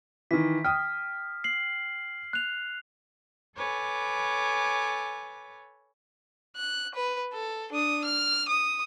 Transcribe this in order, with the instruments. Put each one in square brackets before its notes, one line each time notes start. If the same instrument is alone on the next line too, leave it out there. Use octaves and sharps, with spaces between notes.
[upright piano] D#3 E3 [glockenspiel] B6
[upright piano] G5 D#6 [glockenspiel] F6
[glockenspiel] C7 F#7
F#6 F7
[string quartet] A4 B4 C#5 G#5 D6
[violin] F#6
B4
A4
D4 D#6
F6
D#6